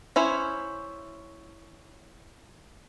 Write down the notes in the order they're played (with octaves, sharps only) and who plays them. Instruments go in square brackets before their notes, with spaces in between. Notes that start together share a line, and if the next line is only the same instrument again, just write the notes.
[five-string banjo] C#4 E4 C5 C#5